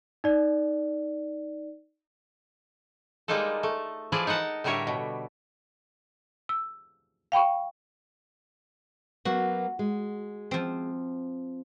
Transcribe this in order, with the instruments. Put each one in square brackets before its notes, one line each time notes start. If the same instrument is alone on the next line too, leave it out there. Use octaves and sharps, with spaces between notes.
[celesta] D#4 D5
[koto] G3 G#3 A#3 D#4 F4 A4
A3
E3 F3 E4 F4 G#4 D5
D#4 A#4 D#5 F#5 A5
A2 D3 G3 A#4 C#5 E5
B2
[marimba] E6
F5 G5 B5 C#6
[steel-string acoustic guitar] F#3 A#3 B3 [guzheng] F#4
[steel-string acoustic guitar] G#3
[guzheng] F3 C4